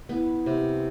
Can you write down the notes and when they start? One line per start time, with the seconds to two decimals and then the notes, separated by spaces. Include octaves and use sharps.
0.09 B3 E4
0.46 C3